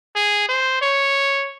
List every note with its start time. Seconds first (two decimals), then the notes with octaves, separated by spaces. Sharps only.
0.16 G#4
0.49 C5
0.82 C#5